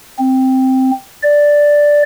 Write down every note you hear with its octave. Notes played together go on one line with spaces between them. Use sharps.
C4
D5